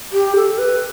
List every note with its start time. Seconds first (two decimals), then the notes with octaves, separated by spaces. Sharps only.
0.13 G4
0.36 A4
0.58 B4